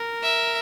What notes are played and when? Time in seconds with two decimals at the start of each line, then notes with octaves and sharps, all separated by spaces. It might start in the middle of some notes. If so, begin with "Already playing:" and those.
Already playing: A#4
0.23 E5